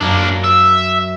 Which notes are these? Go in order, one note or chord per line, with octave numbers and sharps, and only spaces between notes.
F#2 A#3 D4
E5